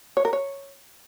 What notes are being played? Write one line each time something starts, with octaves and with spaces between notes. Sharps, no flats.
C#5
A#4
C#5